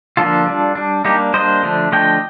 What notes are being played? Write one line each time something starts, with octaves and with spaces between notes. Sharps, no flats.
D3 F3 A#3 D4 F4 A4
G3 D4
G3 D4
G3 A#3 D4 D#4 G4
G3 A#3 D4 C5 D#5
D3 F3 A3 D4
D3 F3 A3 D4 D#5 G5